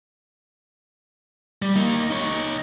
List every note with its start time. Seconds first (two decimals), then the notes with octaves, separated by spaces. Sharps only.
1.62 G3
1.76 A#3 D#4
2.11 D#4 C#5